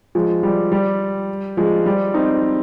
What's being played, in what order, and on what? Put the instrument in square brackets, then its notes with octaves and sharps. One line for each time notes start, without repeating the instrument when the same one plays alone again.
[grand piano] F3 G#3
G3
G3
F3 G#3
G3
C4 D#4